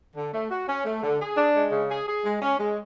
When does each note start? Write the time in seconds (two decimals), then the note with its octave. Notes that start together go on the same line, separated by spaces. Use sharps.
0.15 D3
0.32 A3
0.50 F#4
0.68 C#4
0.85 A3
1.02 D3
1.20 G#4
1.37 D4
1.54 G#3
1.72 C#3
1.89 G#4
2.07 G#4
2.24 G#3
2.41 C#4
2.59 G#3